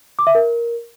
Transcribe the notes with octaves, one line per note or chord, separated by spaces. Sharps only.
D6
E5
A#4